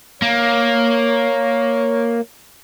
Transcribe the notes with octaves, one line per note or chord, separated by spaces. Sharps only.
A#3 C#5